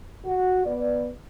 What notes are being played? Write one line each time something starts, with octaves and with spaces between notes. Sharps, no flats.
F#4
B3 D5